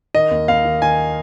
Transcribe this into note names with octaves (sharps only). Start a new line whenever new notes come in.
D#3 D#5
D#2
D#2 F5
D#3
D#3 G#5